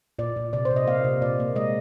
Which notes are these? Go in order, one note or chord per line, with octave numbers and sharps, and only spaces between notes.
A#2 D5
A#2
C3 D5
C5
C3
D#5
A#3 F5
C3
A#2 D5
A#3
G#3 D#5